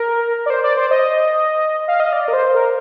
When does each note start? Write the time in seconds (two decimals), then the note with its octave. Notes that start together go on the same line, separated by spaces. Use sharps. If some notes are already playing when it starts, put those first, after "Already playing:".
Already playing: A#4
0.46 D5
0.50 C5
0.64 D5
0.77 C5
0.91 D#5
1.88 F5
2.00 D#5
2.13 D5
2.28 A#4
2.33 C5
2.55 A#4